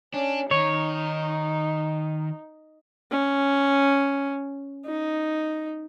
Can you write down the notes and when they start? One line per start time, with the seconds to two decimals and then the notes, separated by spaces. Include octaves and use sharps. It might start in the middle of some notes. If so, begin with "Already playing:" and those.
0.14 C#4 D4
0.51 D#3 D#4 C#5
3.11 C#4
4.86 D#4